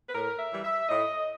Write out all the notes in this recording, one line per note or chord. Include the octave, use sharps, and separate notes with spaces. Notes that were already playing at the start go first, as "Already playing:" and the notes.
B4
A2 A#4
E5
E3 G3
E5
A2 D#5